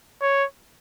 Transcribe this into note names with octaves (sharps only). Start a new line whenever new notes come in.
C#5